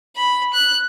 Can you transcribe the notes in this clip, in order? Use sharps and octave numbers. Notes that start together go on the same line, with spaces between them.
B5
F#6